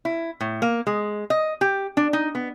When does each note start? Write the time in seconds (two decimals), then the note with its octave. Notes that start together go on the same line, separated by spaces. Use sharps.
0.05 E4
0.40 A2
0.62 A#3
0.87 G#3
1.30 D#5
1.61 G4
1.97 D4
2.13 D#4
2.35 B3